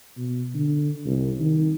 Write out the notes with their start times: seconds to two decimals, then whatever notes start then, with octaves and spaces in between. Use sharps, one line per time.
0.17 B2
0.54 D3
1.05 C2
1.39 D#3